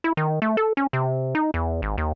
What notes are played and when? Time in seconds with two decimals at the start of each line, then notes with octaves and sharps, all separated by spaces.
0.04 E4
0.17 D#3
0.42 A3
0.57 A4
0.77 C#4
0.93 C3
1.35 D#4
1.54 E2
1.82 G#1
1.98 D#2